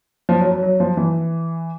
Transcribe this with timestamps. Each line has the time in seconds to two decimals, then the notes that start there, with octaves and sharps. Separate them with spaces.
0.29 F3
0.41 F#3
0.51 F#3
0.63 F#3
0.80 F3
0.97 E3